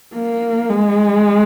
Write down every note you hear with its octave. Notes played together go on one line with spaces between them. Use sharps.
A#3
G#3